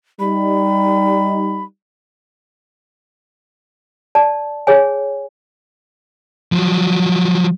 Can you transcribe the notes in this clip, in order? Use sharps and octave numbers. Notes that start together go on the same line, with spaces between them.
G3 D#4 B5
D5 A5
G#4 C#5 G#5
F3 F#3